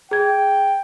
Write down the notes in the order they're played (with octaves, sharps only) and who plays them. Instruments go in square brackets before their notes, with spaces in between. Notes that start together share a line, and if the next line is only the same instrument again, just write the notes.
[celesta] G#4 G#6 [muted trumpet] G5